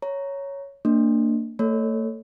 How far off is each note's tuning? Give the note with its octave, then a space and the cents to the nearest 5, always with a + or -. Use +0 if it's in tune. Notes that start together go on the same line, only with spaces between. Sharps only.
C#5 +0 A#5 +0
A#3 -30 D4 +0
A3 +40 A4 +0 C#5 +0